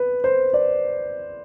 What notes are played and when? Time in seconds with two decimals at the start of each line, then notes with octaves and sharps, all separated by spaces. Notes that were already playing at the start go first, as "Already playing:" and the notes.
Already playing: B4
0.24 C5
0.54 D5